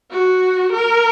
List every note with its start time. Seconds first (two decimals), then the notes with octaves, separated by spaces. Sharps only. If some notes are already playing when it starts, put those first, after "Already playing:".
0.11 F#4
0.72 A#4